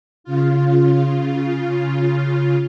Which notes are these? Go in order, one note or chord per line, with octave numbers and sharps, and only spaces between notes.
C#3 F4